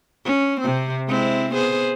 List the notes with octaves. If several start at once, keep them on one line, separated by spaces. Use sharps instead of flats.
C#4
C3 C4
G#3 C4 E4
B3 G#4 C5